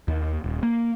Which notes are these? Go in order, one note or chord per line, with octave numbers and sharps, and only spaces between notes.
D#2
D#1
A#3